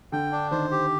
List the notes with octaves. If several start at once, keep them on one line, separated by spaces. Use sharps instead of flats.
D3 G5
D4
D#3 C5
G4